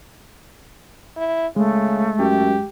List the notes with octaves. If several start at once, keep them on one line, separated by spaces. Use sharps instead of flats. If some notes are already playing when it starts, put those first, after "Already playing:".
E4
C#3 G#3 A3
F#2 G4